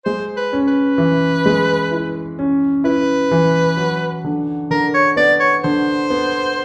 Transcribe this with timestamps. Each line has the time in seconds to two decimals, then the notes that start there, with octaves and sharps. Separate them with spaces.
0.05 G#3 C5
0.37 B4
0.53 C#4
0.68 B4
0.98 E3
1.46 G#3
1.91 E4
2.39 C#4
2.84 E4 B4
3.31 E3
3.77 F#3
4.24 D3
4.71 D3 A#4
4.94 C#5
5.16 B3 D5
5.40 C#5
5.64 D3 C5
6.10 B3